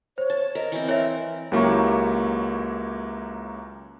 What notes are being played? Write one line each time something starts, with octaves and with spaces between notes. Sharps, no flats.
C5 C#5
A5
A#4 D#5
E3 C4
A#4 C#5 E5
C#2 F#3 A#3 E4 G4 C#6